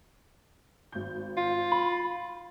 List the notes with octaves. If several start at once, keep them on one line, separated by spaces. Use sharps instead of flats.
G#1 G6
F4
B5